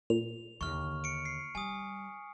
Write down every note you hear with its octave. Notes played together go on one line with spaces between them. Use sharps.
A#2 F7
D#2 D3 C#6 F6
C#7 D7
C7
G3 G#5 D#6